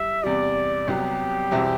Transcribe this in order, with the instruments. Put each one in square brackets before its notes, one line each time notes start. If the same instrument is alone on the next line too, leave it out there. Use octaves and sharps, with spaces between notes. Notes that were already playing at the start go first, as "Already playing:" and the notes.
Already playing: [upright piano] G3 E4 [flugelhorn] E5
[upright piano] E2 C3 G3 [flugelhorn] D5
[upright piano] C2 C3 F#3 B3 [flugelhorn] G4
[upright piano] E2 B2 G3 C4 E4